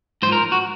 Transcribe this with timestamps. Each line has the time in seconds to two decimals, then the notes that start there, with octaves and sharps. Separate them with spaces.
0.22 G#2 F3 C5
0.32 A#4
0.52 F#4